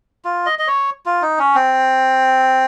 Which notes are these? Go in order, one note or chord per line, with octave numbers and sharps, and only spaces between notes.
F4
D#5
D#5
C#5
F4
D#4
C#4
C4